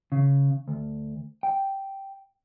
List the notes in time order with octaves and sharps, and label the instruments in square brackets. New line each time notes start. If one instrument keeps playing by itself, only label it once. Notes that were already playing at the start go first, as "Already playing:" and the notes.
[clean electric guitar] C#3
D2
G5